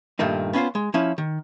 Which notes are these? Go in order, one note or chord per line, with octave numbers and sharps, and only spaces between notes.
G2 A#2 D#3 A3 D#4
B3 C#4 D4 F4 C5
G#3
F3 C#4 E4
D#3